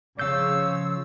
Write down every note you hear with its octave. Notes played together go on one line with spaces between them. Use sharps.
C#3 F3 C#5 F5 E6 G6